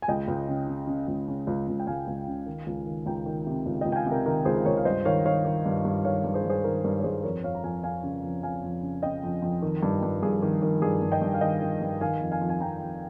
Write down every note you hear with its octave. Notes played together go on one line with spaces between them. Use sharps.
G#5
C#2 D#5 G5
C#2
C#3
C#3
C#3
C#2
C#3
C#2
C#2
G5
C#2 F5 G#5
C#2
C#3
D#3
C#2
D#3
C#2 G5 A#5
D#3
C3
C#2
C#2 D#5 G5
G5
F5 G#5
C3
A#4
D#3 A#4
C#2 G#4 C5
C#2 A#4 C#5
F5
G2 C5 D#5
D#3 C#5 F5
D#3 C#5 F5
D#3
G2
G2
D#3 C#5 F5
G2
G#4 C5
G2
G#4 C5
D#3 A#4
G2 A#4
C#5
G2 G#4 C5
F2 A#4 C#5
F2 C#5 F5
A#5
F2 F5 G#5
F2 F5 G#5
C#3
F2
F2 F5 G#5
F2
C#3
C#3 D#5 G5
F2
F2
D#3
G2
G2
G2 G#4
D#3
D#3
G2 G#4
G2
D#5 G5
G2
F5
D#3 D#5 G5
D#3
G2
D#3 F5 G#5
F2
F5 G#5
F2
G#5
F2 G5 A#5
F2